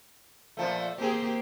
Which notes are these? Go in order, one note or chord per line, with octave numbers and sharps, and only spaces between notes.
A#2 F3 A3
A#3 C4 G4 G#4